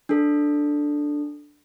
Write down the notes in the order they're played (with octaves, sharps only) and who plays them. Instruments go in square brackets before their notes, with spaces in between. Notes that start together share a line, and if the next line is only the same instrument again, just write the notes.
[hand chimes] D4 A4